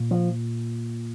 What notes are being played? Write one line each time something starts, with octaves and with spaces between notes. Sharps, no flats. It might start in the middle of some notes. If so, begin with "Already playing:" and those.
Already playing: A#2
F3